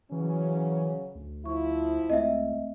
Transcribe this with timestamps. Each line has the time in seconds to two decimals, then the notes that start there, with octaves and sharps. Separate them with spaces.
0.12 C#3 E3 F#3 C#4
1.15 D2
1.46 F3 E4 C#6
2.10 C#2 A3 C4 D#5 E5